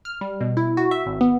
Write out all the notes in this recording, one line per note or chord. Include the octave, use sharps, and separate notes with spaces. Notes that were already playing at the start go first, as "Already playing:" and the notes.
F6
G3
B2
E4
F#4
E5
G#1
B3